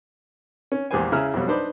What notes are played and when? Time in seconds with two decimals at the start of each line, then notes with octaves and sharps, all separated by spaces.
0.72 C#4
0.91 A#1 E2 G#3 G4 C5 G#5
1.12 C#3 E4 G#4 A#5 E6 F6
1.34 F2 B2 F#3 G3
1.48 D4 D#4 B4 C5 D5 B5